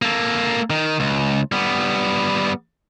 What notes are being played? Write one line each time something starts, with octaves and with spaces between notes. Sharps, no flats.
A#3 A4
D#3
C#2
G3 B3